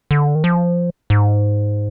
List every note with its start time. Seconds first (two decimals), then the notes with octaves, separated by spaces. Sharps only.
0.11 D3
0.35 D#3
0.44 F3
1.10 G#2